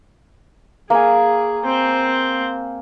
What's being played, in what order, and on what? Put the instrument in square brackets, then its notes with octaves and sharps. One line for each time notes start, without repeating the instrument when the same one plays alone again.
[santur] A#3 G#5 [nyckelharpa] G#4
[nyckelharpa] C4 C5